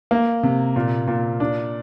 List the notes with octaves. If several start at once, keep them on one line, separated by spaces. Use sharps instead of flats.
A#3
C3
A#2
A#2
D4